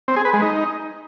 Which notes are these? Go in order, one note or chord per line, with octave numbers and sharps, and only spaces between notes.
C4
G#4
B4
G#3
D#4